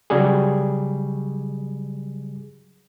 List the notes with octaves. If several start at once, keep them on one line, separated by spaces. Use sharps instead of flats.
C#3 F#3 G3 G#4